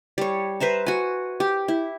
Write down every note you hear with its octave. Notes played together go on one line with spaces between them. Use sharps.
G3 C#5
B4 C5 E5 A#5
F#4 G#5
G4
E4